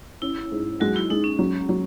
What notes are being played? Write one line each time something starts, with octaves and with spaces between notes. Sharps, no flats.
C#4 E4
G#2
F#3 G#3 F#4
E4
G#3 D#4
C#4
F#3
F#3